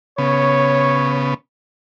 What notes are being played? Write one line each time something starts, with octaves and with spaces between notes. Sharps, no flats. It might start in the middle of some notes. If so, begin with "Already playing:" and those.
C#3 B3 C#5